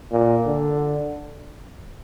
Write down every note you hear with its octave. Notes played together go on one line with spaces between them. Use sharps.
A#2
D3